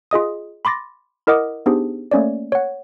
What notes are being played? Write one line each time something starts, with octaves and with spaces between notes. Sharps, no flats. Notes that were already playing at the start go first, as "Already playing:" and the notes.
F4 G#4 D#5 D#6
B5 C6 D6 A6 A#6
E4 A#4 D#5 F#5 D6 D#6
B3 D4 D#4 G4 G#4 C5
A3 A#3 C#4 C#5 D5
C#5 F#5